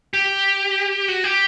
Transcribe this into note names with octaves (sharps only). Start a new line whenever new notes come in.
G4
F#4
G4